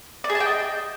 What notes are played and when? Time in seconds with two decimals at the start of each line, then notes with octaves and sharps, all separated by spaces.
0.24 D5
0.30 G#4
0.35 A5
0.40 G5
0.46 D#5